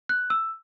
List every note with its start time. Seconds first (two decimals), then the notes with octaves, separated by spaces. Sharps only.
0.09 F#6
0.30 E6